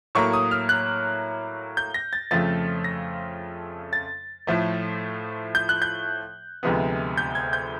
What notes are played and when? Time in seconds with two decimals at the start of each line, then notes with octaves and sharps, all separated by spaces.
0.15 A2 F#3 A#3 C#6
0.33 D#6
0.51 F6
0.69 F#6
1.77 G6
1.94 A#6
2.13 A6
2.31 F2 C#3 F3 A3 A6
2.84 A#6
3.93 A6
4.47 A2 F3 A3
5.55 G6
5.69 F#6
5.82 G6
6.63 D2 C3 F3 G#3 B3
7.17 G6
7.35 G#6
7.53 G6